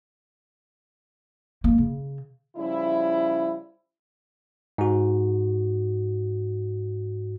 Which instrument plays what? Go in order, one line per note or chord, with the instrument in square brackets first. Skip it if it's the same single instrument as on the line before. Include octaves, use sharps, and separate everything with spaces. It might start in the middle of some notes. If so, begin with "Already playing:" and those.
[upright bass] G#3 A#3
C#3
[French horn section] C#3 F3 G3 E4
[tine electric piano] G#2 F#4